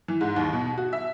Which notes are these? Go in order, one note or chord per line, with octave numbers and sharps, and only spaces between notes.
E3
G#2
D#2
B2
F#4
E5